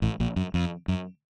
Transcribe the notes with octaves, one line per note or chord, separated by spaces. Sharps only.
A1 A2
A#1 A#2
F#2
F2
F#2